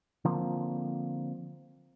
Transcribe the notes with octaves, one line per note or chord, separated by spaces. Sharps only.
D3 F3 A#3 C4